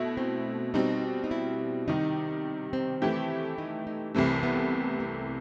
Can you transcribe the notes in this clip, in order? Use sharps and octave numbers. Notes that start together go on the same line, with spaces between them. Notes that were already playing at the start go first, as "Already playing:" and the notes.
Already playing: B2 A3 E4
C4
B2 G3 C4 D#4
D#4
E4
C3 D#3 G3 D#4
C4
E3 A3 E4 G4
D#4
D#4
C2 C3 E3 A3 C4
B3
A3